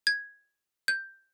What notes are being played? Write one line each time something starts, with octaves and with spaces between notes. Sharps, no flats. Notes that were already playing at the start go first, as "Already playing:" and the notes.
G#6
G6